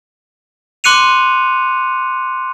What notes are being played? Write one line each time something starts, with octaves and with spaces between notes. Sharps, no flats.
C6 D6 F#6 C#7 D#7 F7